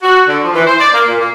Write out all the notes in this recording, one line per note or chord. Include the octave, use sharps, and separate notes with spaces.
F#4
D3
F3
E3
C5
D5
A#3
A#2
A#3